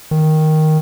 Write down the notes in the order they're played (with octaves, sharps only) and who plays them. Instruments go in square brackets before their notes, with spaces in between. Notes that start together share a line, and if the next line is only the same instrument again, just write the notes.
[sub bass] D#3